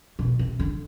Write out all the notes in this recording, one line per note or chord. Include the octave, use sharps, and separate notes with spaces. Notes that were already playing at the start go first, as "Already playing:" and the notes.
B2
C3
D3